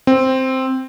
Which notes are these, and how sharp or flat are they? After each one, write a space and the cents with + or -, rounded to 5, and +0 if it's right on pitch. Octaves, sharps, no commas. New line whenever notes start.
C4 +0